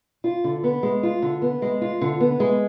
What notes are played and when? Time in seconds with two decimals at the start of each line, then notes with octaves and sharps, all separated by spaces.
0.24 F4
0.44 D3
0.64 B3
0.83 G#3
1.03 F4
1.22 D3
1.42 B3
1.62 G#3
1.81 F4
2.01 D3
2.20 B3
2.40 G#3